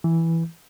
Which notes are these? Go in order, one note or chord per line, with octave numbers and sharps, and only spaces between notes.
E3